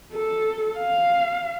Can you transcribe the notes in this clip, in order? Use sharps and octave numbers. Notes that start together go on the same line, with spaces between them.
A4
F5